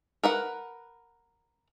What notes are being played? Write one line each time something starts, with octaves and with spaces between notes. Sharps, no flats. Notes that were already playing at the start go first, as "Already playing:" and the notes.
A#4 B4 F#5